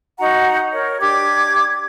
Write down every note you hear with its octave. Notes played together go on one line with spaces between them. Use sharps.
D#4 F#4 F#5 A#5
A#4 C#5
D4 G4 D6 G#6